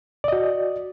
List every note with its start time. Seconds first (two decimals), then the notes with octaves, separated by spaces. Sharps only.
0.24 D5
0.28 D#5
0.32 F#4